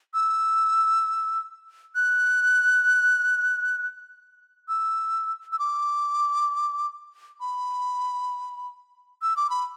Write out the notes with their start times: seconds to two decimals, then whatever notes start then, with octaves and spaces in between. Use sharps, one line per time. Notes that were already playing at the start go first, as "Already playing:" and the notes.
0.14 E6
1.95 F#6
4.68 E6
5.52 E6
5.59 D6
7.41 B5
9.22 E6
9.37 D6
9.50 B5